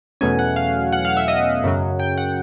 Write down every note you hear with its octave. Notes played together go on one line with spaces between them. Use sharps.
E2 B2 F#3 A3 C#4 G#5
F#5
F5
F#5
F5
E5
D#5
F#2 C#3 F#3
G5
F#5